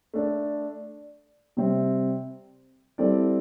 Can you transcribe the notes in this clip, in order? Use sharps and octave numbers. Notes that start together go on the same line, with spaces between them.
A3 D4 A4
C3 G3 C4
G3 C4 E4 A4 D5